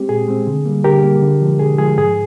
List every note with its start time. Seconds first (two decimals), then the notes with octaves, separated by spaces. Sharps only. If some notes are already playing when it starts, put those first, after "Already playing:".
Already playing: G#3 C4 G4
0.09 A#2 G#4
0.28 G#3 C4
0.47 D3
0.65 G3 A#3
0.84 D3 G4 A#4
1.03 G3 A#3
1.22 D3
1.41 F3 G#3
1.59 D3 G#4
1.78 F3 G#3 G#4
1.98 G#2 G#4